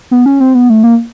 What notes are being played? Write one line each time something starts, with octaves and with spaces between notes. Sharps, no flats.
B3
C#4
C4
B3
A3
A#3